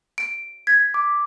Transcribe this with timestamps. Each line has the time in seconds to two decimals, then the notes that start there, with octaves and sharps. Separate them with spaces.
0.18 D7
0.67 G#6 B6
0.94 D6